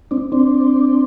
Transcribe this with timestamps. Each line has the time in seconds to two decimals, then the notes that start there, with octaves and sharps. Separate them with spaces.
0.11 C4 D4
0.32 C4 D4